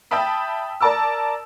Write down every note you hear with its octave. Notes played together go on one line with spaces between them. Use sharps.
E5 G5 A5 B5 D#6
A#4 D5 A5 D6 E6